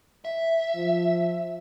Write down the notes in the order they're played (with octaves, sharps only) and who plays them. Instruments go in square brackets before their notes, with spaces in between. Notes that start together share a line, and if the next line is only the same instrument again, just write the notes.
[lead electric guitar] E5
[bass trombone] F3